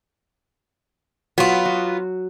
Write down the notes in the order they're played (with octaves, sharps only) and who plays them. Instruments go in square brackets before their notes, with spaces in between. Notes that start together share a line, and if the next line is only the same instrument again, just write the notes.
[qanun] F#3 [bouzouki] B3 F4
[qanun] F#4